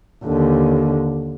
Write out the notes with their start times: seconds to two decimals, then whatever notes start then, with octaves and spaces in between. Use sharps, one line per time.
0.24 D#2 D3